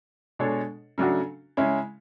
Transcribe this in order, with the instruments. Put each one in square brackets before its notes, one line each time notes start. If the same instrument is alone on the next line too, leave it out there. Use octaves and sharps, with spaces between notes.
[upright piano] B2 G#3 D4 A4 C#5
C#3 F#3 A3 D4 F#4
C#3 G#3 C#4 E4